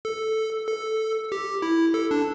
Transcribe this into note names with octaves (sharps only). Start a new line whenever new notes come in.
A4
A4
G4
E4
A4
D4